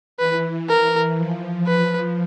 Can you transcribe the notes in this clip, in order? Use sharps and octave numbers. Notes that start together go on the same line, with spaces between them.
E3 B4
A#4
F3
B4